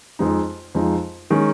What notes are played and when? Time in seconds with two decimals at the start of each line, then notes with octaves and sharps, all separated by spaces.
0.19 F2 F3 G#3 D#4
0.75 F2 F3 G#3 D#4
1.31 D#3 G#3 C#4